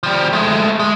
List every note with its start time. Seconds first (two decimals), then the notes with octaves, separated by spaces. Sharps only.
0.03 F3 G3
0.33 G#3 A3
0.79 G#3